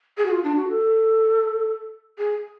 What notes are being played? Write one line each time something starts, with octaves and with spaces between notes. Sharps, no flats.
G#4
F#4
F4
D4
F#4
A4
G#4